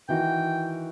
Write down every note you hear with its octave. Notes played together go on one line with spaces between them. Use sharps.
D#3 E3 F#4 G5